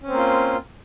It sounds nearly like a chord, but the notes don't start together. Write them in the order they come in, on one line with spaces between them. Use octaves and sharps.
C#4 C4 A#3 F4